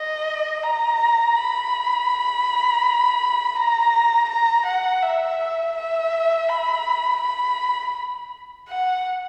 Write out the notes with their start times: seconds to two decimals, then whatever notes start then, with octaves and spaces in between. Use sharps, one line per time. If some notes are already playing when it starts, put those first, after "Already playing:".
Already playing: D#5
0.63 A#5
1.36 B5
3.56 A#5
4.29 A#5
4.66 F#5
5.02 E5
5.76 E5
6.49 B5
7.22 B5
8.68 F#5